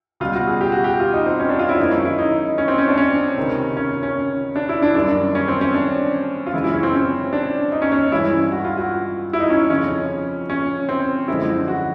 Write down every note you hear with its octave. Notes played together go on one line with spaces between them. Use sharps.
C#2 B2 G3 F4
F#4
G#4
G4
F#4
G4
F4
D#4
C4
C#4
D4
F4
E4
F#2 D#3 G#3 D#4
C#4
E4
D#4
C#4
C4
C#4
D4
C#4
C#2 C3 D#3
C#4
C#4
D4
E4
D4
F#2 D#3 G3 D4
C#4
C4
C#4
D4
F4
F#2 C#3 E3 G#3 E4
E4
C#4
C4
C#4
D4
D#4
C#4
C#4
G2 E3 G#3 E4
F#4
F4
F#4
E4
D#4
C#4
F2 C#3 F3 C#4
C#4
C4
F#2 D3 F3 G#3 E4
F#4